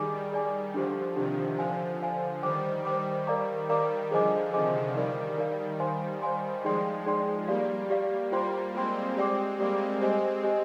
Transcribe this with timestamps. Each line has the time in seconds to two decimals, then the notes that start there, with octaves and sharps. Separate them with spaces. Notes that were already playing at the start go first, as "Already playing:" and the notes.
Already playing: D#3 G3 G#4 D5 G#5 D6
0.32 G#4 D5 G#5 D6
0.74 D3 F3 D4 G4 C5
1.16 C3 D#3 D4 G4 C5
1.58 D3 F3 C5 F5 G#5
2.01 C5 F5 G#5
2.43 D#3 G3 C5 G5 D6
2.85 D#3 G3 C5 G5 D6
3.27 A#4 D5 F5 A#5 D6
3.69 D#3 G3 A#4 D5 F5 A#5 D6
4.11 D3 F3 G#4 C5 D#5 G#5 D6
4.53 C3 D#3 G#4 C5 D#5 G#5 D6
4.95 D#3 G3 D#4 A#4 D5 F5
5.38 D#4 A#4 D5 F5
5.80 C5 F5 G#5 C6
6.22 C5 F5 G#5 C6
6.64 F3 G#3 D#4 G#4 D5 G5 C6
7.06 D#4 G#4 D5 G5 C6
7.48 G3 A#3 G4 D5 F5
7.90 G4 D5 F5
8.32 G3 A#3 F4 C5 G5 C6
8.75 G#3 C4 F4 C5 G5 C6
9.16 G#3 C4 G4 D5 G5 D6
9.58 G3 A#3 G4 D5 G5 D6
10.01 G#3 C4 G4 C5 D#5 G#5
10.43 G4 C5 D#5 G#5